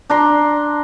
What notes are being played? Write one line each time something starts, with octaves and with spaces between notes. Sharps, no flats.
D4 A#5 C6